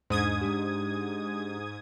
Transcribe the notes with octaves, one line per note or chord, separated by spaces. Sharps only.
E2 G#2 D4 D#6 G#6
G#3 D4 G4